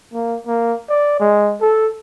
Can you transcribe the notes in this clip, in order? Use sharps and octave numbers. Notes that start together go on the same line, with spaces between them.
A#3
A#3
D5
G#3
A4